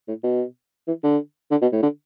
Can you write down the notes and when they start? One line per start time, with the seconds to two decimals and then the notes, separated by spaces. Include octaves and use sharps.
0.08 A2
0.23 B2
0.87 E3
1.03 D3
1.51 D3
1.62 B2
1.72 A2
1.82 D3